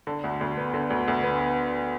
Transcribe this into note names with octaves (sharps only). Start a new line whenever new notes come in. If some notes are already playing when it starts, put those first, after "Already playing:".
D3
D2
D2
B3
D3
D2
D2
B3